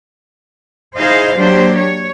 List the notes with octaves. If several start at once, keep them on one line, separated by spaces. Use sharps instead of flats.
D#4 E4 G#4 C5 D#5 F5
F#3 A#3 D4 G4 C5
C#5